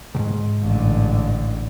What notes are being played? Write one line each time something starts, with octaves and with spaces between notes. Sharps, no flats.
C#2 G#2
A1 D3